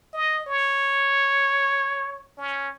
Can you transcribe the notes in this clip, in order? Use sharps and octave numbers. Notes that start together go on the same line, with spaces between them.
D#5
C#5
C#4